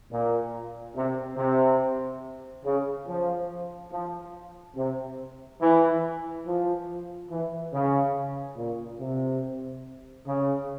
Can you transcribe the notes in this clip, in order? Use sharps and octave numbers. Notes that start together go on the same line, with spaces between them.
A#2
C3
C3
C#3
F3
F3
C3
E3
F3
E3
C#3
A#2
C3
C#3